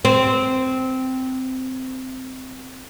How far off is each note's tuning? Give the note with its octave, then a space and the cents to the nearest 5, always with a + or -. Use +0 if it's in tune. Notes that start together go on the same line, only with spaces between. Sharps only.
C4 -10